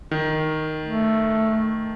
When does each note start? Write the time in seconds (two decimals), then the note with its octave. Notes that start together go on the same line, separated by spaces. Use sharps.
0.11 D#3
0.85 A3